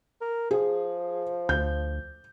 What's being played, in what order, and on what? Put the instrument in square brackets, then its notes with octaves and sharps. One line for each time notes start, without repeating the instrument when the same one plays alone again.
[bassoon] A#4
[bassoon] F3 [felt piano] G#4
[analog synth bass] D2 [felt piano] G6